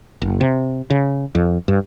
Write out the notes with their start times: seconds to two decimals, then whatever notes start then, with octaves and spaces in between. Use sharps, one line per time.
0.22 F#1
0.41 C3
0.90 C#3
1.35 F2
1.68 G2